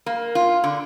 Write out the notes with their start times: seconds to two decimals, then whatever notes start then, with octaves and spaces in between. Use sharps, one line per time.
0.06 A#3
0.35 F4
0.64 D3